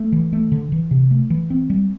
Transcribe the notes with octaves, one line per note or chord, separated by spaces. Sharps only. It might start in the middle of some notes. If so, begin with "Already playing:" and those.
Already playing: A3
E3
A3
D3
E3
C3
A3
E3
C4
G3